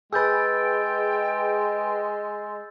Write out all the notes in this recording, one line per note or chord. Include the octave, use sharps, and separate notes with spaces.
G#3 G#4 B4 G5 E6 G6 A6